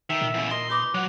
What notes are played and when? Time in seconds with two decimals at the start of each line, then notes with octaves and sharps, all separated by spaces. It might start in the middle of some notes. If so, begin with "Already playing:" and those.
0.10 D#3 A4 E5
0.21 A#2
0.34 E2 C#3
0.51 A#4 D#5 C6
0.70 D#4 B4 D6 D#6
0.94 F#3 F#5